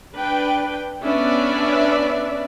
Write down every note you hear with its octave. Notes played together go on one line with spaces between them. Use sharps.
D4 B4 G5
B3 C#4 D4 B4 D5 E5